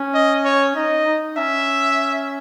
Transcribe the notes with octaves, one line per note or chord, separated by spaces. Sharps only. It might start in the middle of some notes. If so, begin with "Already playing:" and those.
Already playing: C#4
D#5
C#5
D#4 D#5
D#4
C#4 E5